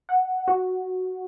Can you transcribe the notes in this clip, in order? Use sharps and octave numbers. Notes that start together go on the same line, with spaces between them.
F#5
F#4